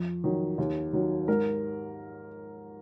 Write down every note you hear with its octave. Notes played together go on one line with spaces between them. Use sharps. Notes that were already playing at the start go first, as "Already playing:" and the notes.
Already playing: F2
D#3 F#3
D#2
D#3 F#3
G#2 A#4